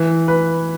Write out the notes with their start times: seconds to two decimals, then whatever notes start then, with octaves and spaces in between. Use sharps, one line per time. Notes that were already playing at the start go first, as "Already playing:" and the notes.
Already playing: E3
0.28 B4